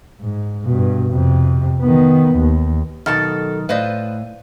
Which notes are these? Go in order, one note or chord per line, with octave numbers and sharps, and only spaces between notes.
G#2
G2 B2
F2 C3
D#3 B3
D#2
B1 B2 D#3 D#4 A4 A5 F6
A2 B4 C5 D5 D#5 F5